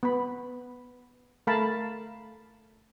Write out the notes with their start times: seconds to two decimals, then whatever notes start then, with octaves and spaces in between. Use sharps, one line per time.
0.03 B3 B5
1.47 A3 A#4 F5 A5 B5